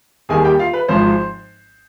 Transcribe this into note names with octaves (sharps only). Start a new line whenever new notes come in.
D#2 D#3 G3 G#4 G#5
G4 G5
F4 F5
B4
G#1 G#2 F3 C5